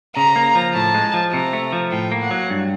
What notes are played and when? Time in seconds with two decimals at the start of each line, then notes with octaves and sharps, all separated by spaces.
0.16 C#3 A#5
0.36 A#3
0.55 F3
0.75 A2 A5
0.94 G#3
1.14 F3
1.33 C3 A#5
1.53 A3
1.73 F3
1.92 A2 G5
2.12 A#3
2.22 F#5
2.31 F#3
2.50 G2